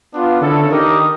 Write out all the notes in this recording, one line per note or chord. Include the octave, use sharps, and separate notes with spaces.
B3 D4 F4
D3 C#4 E4 A4
D#3 D#4 G4 A#4 D#5